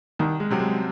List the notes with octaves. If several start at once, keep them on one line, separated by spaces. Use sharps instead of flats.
C2 D#3
G#3
C3 F#3 C4
G#3